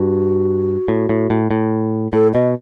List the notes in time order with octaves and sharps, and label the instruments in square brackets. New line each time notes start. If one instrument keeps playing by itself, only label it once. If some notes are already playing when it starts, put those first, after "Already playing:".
Already playing: [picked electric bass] G2 [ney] F#4
[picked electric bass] A2
A2
A2
A2
[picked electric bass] A2 [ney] A4
[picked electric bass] B2 [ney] D#5